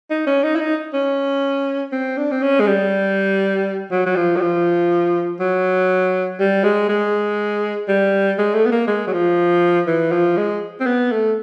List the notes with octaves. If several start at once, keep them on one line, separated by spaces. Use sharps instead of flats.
D#4
C#4
D#4
E4
D#4
C#4
C4
D4
C4
C#4
G#3
G3
F#3
F#3
F3
F#3
F3
F#3
G3
G#3
G#3
G3
G#3
A3
B3
A#3
G#3
F#3
F3
E3
F3
G#3
C4
B3
A3